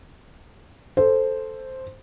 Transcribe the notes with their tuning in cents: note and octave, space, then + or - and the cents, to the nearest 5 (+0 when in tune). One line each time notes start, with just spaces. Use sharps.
A4 +0 C5 +0